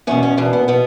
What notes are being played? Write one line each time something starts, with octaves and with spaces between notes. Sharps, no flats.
E2 B2 C#4
C#4
E2 B2 D4
B3
B2 B3